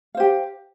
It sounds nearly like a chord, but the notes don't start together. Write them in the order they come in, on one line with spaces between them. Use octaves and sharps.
F5 C5 G4